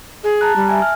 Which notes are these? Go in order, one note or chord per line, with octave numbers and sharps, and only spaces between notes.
G#4
A5 A#5 F#6
G3
E5 G#5
F6